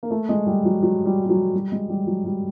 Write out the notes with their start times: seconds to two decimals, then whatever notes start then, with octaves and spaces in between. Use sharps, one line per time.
0.03 A#3
0.11 A3
0.29 G#3
0.46 G3
0.65 F#3
0.83 F#3
1.06 G3
1.25 G3
1.30 F#3
1.54 G3
1.72 G#3
1.89 G3
2.07 F#3
2.25 G3